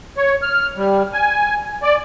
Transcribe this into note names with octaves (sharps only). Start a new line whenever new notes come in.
C#5
F6
G3
G#5
D5